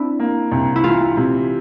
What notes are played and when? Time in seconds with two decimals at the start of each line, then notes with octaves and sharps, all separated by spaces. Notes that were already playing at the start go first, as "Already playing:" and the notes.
Already playing: C4 D4 E4
0.20 A#3
0.52 C2
0.76 E4
0.84 E3 F4
1.17 C3